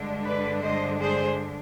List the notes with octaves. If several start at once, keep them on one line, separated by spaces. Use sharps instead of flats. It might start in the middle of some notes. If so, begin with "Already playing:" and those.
Already playing: G2 D3 G#3 D4
B4 D5
C5 D#5
G#4 C5